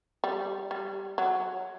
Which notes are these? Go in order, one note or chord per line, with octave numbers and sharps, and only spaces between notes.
G3
G3
F#3